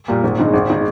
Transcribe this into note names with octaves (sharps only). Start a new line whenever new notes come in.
A#2 G3 A#3
G#1
G2 D#3 G#3 D#4
G#1
D#3 G#3 D#4